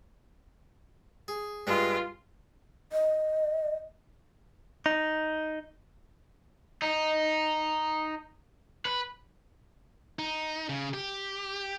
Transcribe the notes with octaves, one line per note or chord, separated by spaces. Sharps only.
G#4
G2 G#3 F4
D#5
D#4
D#4
B4
D#4
C#3
G4